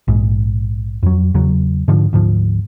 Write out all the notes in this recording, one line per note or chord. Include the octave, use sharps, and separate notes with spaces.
A#1 G#2
F2 F#3
E2 C#3 F#3
G#2 D3 F3
D2 G#2 F3